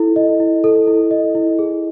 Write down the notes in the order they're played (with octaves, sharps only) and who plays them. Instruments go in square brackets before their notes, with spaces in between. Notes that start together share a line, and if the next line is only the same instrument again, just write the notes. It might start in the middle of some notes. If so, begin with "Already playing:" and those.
Already playing: [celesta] E4 A4
D#5
E4
A4
E4
D#5
E4
G#4